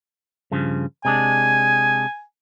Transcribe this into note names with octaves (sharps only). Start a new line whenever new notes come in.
G2 C#3 F3
C3 G#3 D4 G#5